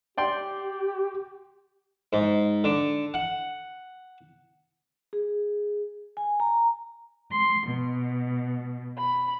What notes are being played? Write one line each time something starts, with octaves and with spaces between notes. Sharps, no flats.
G4 D5 G5 C6
G#2
D3
F#5
G#4
G#5
A#5
C6
B2
B5